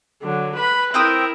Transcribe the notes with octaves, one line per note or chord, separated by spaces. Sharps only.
D3 F#3
B4 B5
C4 E4 A#4 G5 D#6